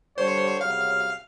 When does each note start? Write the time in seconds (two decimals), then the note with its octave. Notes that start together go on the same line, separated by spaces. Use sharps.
0.18 D3 G3 C5 C#5
0.61 C2 C#3 F#3 F5 F6